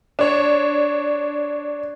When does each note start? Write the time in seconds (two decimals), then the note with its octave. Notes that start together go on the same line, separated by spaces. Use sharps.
0.19 D4 C#5